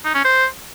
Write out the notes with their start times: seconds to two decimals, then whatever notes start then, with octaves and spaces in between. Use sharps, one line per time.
0.05 D#4
0.15 C#4
0.25 C5